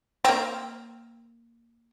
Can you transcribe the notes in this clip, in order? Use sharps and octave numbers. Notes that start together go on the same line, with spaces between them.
C4
A#3